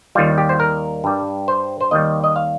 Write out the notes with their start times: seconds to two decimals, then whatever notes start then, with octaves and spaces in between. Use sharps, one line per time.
0.15 D#2 D#3 G3 F4
0.38 G4
0.49 C5
0.60 A#4
1.04 G2 G3
1.48 C5
1.81 C5
1.91 D#2 D#3 G3 D#5
2.24 D#5
2.36 F5